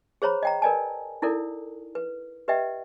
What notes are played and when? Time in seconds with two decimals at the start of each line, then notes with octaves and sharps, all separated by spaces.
0.22 G#4 C5 C#5 A#5 B5
0.43 D#5 G5 A#5
0.62 A#4 B4 D5 D#5 G#5 A5
1.22 D#4 E4 A4 A#4 D5
1.95 B4
2.48 G4 B4 D#5 E5 G5